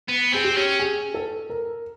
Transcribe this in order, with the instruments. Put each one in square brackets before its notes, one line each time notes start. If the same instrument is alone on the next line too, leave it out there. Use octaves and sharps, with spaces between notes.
[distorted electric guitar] B3
[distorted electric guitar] C4 [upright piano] G#4
[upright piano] G4
[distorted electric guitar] C#4
[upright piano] G#4
A4
A#4